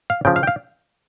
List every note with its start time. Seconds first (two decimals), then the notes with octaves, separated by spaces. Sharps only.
0.10 F5
0.25 C#3 F3 G5
0.36 F5
0.43 G5
0.47 F5